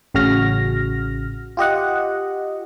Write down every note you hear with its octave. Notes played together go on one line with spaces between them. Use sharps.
A1 C#3 F#4 F6 A#6
F4 G4 D#5 F#5